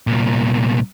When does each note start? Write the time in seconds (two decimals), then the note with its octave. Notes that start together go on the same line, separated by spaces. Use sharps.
0.07 C2 A#2